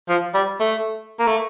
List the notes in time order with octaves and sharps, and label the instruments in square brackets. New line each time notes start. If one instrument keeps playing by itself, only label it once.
[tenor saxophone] F3
G3
A3
A#3
A3